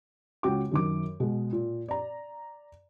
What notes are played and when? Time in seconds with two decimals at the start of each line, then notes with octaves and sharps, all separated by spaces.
0.43 C#2 C#4 F#4 G5 D6
0.71 F#2 D#3 D6
1.20 B2 G#3
1.53 A#2
1.88 D5 A#5